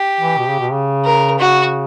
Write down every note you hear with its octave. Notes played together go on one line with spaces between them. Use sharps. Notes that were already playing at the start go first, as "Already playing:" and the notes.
Already playing: G4
E3
B2
C#3
B2
C#3
A#4
C#3 F#4